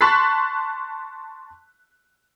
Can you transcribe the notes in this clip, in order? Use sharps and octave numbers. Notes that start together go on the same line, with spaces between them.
A5 C6 C#6 F#6 A6 B6